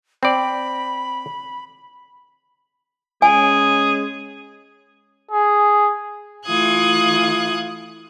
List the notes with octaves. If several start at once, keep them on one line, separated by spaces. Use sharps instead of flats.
C4 D5 B5
G#3 C#4 G#4 G#5
G#4
E3 A3 F4 D#6 F#6 G#6